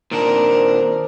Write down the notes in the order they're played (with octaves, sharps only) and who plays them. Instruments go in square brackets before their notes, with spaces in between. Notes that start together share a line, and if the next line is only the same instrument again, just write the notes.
[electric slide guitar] A#2 D#3 D4 [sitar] C4 [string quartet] A#4